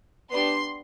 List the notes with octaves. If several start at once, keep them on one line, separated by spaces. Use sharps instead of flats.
B3 D4 G4 C6